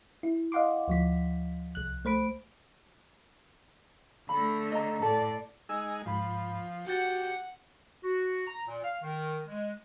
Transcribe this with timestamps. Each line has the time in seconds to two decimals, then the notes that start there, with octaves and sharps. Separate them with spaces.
0.23 E4
0.52 D#5 F5 F#5 C6 D6
0.88 D2 F3 B6
1.75 C2 F#6
2.05 A3 C5 B5 D7
4.29 D3 A3 B5
4.72 D#5 A#5
5.02 A2 A4 D5
5.69 G#3 D#4 G#4 E6
6.06 C#2 G#2 F3 B5
6.87 F#4 G4 F#5 G6 A6
8.04 F#4
8.47 A#5
8.67 A#2
8.84 F5
9.03 D#3
9.48 G#3